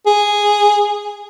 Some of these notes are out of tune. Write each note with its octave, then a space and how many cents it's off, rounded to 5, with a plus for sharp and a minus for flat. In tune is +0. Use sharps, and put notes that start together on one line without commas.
G#4 -5